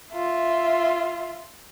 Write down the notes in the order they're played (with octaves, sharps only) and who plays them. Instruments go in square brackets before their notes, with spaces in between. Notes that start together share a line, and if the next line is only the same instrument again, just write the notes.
[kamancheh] F4 E5